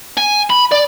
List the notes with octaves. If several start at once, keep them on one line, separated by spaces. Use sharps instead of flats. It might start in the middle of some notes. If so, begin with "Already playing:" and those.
G#5
B5
D5